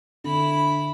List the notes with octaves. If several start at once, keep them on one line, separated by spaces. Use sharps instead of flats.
D3 E4 B5